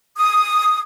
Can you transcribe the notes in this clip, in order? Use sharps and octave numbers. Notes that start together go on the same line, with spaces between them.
D#6